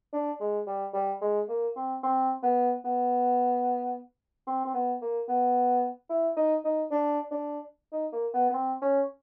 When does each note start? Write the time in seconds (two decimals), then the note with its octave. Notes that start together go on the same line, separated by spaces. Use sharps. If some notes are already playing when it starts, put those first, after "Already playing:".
0.13 D4
0.40 G#3
0.67 G3
0.94 G3
1.21 G#3
1.49 A#3
1.76 C4
2.03 C4
2.43 B3
2.85 B3
4.47 C4
4.65 C4
4.74 B3
5.01 A#3
5.28 B3
6.10 E4
6.37 D#4
6.65 D#4
6.91 D4
7.31 D4
7.92 D#4
8.13 A#3
8.34 B3
8.50 B3
8.54 C4
8.82 C#4